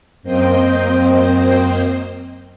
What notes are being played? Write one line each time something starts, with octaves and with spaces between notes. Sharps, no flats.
F#2 A#3 C4 C5 D#5 G5